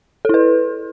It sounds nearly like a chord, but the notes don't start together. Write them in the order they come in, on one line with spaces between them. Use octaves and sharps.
A4 E4 B4